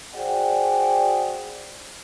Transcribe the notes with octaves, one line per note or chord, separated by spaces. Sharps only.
F#4 G#4 C5 D5 F#5 G5